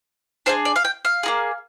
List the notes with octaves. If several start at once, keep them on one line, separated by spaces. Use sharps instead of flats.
D4 F4 G#4 C5
D5
F5
G5
F5
A#3 D#4 G#4